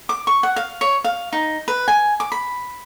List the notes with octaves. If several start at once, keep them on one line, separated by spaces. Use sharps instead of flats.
D6
C#6
F#5
F5
C#5
F5
D#4
B4
G#5
D6
B5